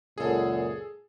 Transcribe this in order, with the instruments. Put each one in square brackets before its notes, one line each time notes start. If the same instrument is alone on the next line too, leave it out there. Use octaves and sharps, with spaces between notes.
[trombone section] C#2 F#2 A#2 [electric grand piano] G#4 A4